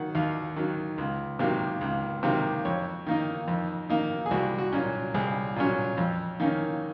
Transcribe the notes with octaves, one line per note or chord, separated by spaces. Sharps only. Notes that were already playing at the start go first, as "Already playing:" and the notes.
Already playing: D#3 F#3 F#5
D#2 F5
D#3 F#3
C#2
C3 D#3 F#3 A#3
C#2
C3 D#3 F#3 A#3
F2 C#5
D#3 A#3 D#4
F2
D#3 A#3 D#4
G#4
C2 F#4
F#4
A#2 F#3 C#4
C2 G#4
A#2 F#3 C#4
F2
D#3 A#3 C#4